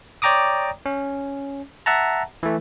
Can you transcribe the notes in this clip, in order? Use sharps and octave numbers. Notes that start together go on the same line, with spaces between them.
C#5 D5 G5 A#5 D6 D#6
C#4
E5 F#5 A5 A#5
E3 A3